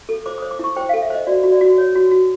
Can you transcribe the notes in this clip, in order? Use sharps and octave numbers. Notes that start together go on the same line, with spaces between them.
A4
C5 D6
D#6
C5
D6
E4 C#6
C5 G5
F5
A4
E5
C5 D#5
F#4 D5
F#4
D5
F#4
C#5
F#4
F#4